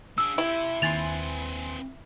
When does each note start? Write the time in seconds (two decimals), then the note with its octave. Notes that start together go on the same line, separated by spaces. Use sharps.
0.18 D4 G#4 E6
0.38 E4 G4 C5
0.82 D#2 C4 B4 G#5 C6 A6 F7